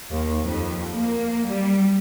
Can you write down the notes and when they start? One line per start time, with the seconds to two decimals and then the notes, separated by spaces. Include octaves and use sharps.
0.11 D#2
0.44 F2
0.94 A#3
1.47 G3